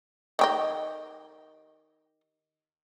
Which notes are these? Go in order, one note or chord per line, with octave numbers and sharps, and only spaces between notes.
D#3 G4 D#5